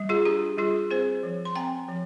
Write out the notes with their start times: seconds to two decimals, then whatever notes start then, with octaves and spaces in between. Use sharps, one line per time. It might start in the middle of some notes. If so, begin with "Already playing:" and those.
Already playing: G3
0.09 F4 G#4
0.25 D4 G4
0.58 G3 F4 G#4
0.90 C4 G#4 C5
1.23 F3
1.45 C6
1.56 C4 G5 A#5
1.88 F3